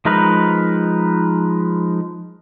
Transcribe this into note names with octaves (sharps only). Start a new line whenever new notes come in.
F3 G#3 D#4 A#4 B4